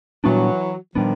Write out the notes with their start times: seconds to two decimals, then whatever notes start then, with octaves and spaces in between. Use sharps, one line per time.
0.23 A#2 E3 F#3 G3 B3 D4
0.94 A#2 D#3 F3 G3 B3 D4